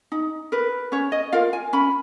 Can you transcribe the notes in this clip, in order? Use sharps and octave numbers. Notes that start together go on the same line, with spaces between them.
D#4
A#4 B4
C#4 C#5
D#5
F4 A#4 F5
G#5
C#4 B5